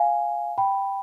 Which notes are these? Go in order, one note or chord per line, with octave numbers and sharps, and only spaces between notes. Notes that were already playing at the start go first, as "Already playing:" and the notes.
Already playing: F5 G#5
G5 B5